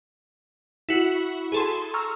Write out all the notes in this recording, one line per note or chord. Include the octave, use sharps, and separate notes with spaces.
E4 F#4
G#4 A4 C6
A#5 C#6 E6 F6